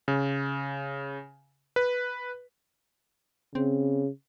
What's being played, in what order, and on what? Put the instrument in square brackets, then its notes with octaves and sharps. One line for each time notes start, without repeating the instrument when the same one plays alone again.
[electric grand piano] C#3
B4
[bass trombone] C#3 [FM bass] C4